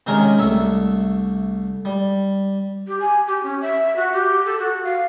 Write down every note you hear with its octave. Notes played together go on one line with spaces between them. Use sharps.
C3 D#3 G#3 C#4 A#4
C2 A3 E5
G3
G4
G#5
G4
C#4
E5
F#4
G4
A4
F#4
F5